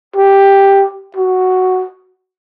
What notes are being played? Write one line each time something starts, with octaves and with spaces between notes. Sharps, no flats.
G4
F#4